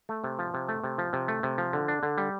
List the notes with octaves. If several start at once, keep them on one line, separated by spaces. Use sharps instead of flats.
A3
C3
F3
C3
A3
C3
F3
C3
A3
C3
F3
D3
D4
D3
G3